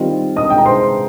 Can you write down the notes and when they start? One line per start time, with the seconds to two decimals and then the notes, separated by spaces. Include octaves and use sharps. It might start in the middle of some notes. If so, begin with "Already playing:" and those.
Already playing: D#3 G3 C4 F4 D#5
0.36 D#5 D#6
0.50 G5
0.58 A#5
0.65 C5 C6